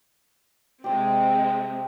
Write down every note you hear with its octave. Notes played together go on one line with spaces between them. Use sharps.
C3 G#3 C4 G4